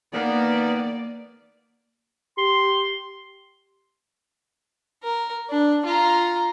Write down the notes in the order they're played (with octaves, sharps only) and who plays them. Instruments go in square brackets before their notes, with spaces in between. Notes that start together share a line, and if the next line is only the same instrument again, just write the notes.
[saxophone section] D#3 B3 [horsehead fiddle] A#3 D5
[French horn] G4 [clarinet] C6
[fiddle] A#4
D4
F4 A#5